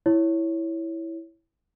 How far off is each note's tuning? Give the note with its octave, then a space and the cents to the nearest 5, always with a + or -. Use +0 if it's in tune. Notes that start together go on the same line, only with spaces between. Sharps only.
E4 +0 C#5 +0